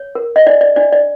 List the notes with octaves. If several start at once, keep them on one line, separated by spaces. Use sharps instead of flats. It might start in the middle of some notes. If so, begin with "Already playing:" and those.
Already playing: C#5
A#4
D#5
D4 D5
D5
D4 D5
D5